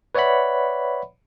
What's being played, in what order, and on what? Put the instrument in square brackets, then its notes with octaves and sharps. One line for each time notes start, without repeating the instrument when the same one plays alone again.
[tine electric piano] B4 C#5 D5 E5 F#5 B5